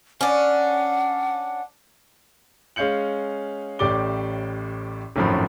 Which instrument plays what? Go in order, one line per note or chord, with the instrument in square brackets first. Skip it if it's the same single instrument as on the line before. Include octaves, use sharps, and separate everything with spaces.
[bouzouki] C#4 D4 [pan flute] F#5
[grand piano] G#3 C#4 F5 G6 C#7 F#7
A1 A2 G4 D5 D6 G7
G#1 F#2 A2 F3 B5